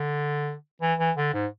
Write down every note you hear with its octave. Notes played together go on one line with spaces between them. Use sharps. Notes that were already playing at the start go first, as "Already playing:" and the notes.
Already playing: D3
E3
E3
D3
G#2